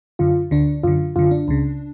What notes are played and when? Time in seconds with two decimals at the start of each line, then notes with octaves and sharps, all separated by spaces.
0.19 F#2 D3 F4
0.51 D2 D3 D4
0.83 F#2 D3 F4
1.16 F#2 D3 F4
1.31 D4
1.48 C#2 C#3